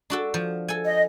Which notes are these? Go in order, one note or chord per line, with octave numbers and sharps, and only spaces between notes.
D4 F#4 A4
F3
A4 G#5
D#5